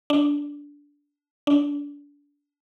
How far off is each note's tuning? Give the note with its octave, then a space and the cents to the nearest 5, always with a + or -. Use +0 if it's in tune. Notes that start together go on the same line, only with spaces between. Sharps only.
D4 -15
D4 -30